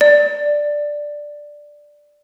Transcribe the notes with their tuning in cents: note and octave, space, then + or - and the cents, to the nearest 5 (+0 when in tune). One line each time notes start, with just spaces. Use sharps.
D5 +5